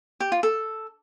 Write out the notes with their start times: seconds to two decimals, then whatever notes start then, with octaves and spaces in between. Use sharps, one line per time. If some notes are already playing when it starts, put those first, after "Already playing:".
0.20 G4
0.32 F4
0.43 A4